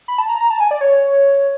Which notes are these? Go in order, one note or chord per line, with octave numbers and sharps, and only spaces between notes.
B5
A5
A#5
A#5
A5
G#5
D5
C#5